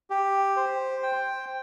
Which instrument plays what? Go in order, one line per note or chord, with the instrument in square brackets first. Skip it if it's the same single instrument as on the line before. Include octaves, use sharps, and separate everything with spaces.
[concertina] G4
C5
G5